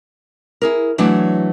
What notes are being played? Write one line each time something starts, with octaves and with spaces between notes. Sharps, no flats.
E4 G#4 A#4
E3 F#3 A3 D4